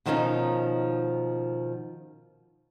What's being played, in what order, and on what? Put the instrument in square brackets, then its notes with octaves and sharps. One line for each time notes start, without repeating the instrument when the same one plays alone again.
[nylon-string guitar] B2 D#3 F3 G3 C#4 D#4